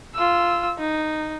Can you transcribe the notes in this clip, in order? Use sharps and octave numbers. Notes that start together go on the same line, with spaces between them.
F4 E6
D#4